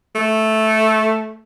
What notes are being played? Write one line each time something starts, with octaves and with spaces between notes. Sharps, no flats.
A3